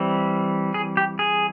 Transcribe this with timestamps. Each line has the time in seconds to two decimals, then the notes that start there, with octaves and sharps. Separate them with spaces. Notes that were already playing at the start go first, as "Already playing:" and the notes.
Already playing: E3 G3 C4
0.74 G#4
0.97 G4
1.19 G#4